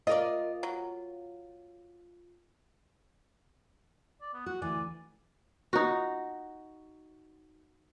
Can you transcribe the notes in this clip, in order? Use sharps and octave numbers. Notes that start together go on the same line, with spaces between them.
F4 A#4 D5 D#5
F#3
D5
B3
F#4 F#5
D2 E3 D5 G#5
D#4 F#4